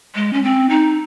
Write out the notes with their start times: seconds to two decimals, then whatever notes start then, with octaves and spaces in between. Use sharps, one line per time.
0.15 G#3
0.33 C#4
0.43 C4
0.70 D#4